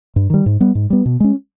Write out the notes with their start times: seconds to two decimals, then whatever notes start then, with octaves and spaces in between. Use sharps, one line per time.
0.16 G2
0.30 D#3 G3
0.46 G#2
0.60 G3 B3
0.75 G#2
0.90 G3 B3
1.06 B2
1.20 G#3 C#4